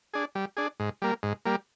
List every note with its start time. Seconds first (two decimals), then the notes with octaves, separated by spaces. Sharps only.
0.14 D4 G#4
0.35 G3
0.57 D4 G#4
0.80 G#2
1.02 G3 A#3
1.23 G#2
1.45 G3 A#3